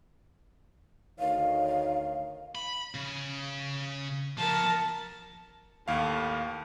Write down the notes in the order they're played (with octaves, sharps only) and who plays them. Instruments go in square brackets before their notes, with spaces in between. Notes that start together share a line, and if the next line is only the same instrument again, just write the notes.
[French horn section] D2 D#3 C#5 [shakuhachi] F5
[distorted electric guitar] B5
C#3
[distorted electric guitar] F3 B3 [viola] A#4 A5
[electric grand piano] D#2 F5 [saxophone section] A2